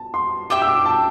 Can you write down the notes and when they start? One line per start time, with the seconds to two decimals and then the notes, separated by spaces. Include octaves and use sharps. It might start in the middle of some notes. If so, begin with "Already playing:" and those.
Already playing: A5
0.14 C6
0.50 D4 G4 E5 G5 D6
0.62 E6
0.68 D6
0.85 A5